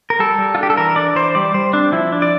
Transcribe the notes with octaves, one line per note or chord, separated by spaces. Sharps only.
A#4
G3 A4
G3
F4
D4
G4
A4
E3 A#4
D4 D5
E3 C5
G3 D5
G3 C5
C4 D4
F3 E4
D4
D5